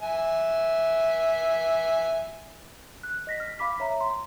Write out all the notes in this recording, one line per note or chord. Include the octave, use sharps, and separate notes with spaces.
E5 G#5
F#6
D#5 A#6 B6
F6
F5 B5 D6 B6
C#5 E5 A#5
C6